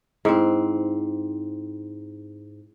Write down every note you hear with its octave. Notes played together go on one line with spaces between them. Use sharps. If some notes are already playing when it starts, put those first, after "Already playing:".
G#2 C4 E4